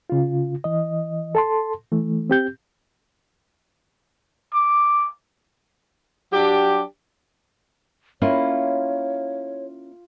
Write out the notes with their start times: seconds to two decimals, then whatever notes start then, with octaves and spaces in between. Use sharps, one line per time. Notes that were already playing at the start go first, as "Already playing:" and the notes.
0.10 C#3 F4
0.64 E3 D#5
1.35 A4 A5 C6
1.92 E3 A3
2.30 C4 G4 G6
4.54 D6
6.32 F#3 D4 G4
8.22 A#3 C#4 E4 F4 C#5